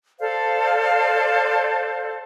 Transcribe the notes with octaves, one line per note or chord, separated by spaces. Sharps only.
A4 C5 D5 F5